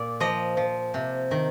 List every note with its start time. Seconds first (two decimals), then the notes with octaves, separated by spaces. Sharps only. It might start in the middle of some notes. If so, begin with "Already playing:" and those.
Already playing: A#2 D5
0.20 F3 D#5
0.57 F3
0.94 C3
1.31 D#3